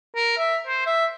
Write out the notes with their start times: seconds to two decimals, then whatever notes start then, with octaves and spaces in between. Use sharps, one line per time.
0.16 A#4
0.38 E5
0.67 C5
0.86 E5